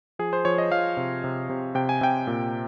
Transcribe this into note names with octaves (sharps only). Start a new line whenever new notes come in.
F3 G#4
C5
F3 C#5
D#5
F3 F5
C3
C3
C3
C3 G5
G#5
C3 G5
A#2